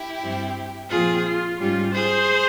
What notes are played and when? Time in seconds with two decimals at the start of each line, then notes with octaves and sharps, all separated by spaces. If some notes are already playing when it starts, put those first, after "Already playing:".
Already playing: E4 G4
0.20 G2 G3 C4
0.89 A#2 F3 C4 F4 G#4
1.24 F4
1.58 G#2 G3 C#4 F4
1.93 G#4 C5